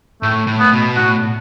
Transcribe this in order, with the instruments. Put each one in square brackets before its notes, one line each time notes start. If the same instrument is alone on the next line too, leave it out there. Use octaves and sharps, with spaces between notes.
[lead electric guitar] A2 [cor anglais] A3
[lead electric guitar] A2
[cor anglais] B3
[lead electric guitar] B2
[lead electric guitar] A2 [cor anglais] F#4